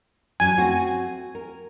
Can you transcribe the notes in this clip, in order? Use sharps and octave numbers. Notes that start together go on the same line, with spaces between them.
F#2 F#3 G#5
A3 C4 F#4
A#4